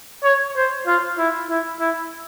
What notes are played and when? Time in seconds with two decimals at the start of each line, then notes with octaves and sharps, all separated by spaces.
0.24 C#5
0.56 C5
0.87 F4
1.18 E4
1.50 E4
1.80 E4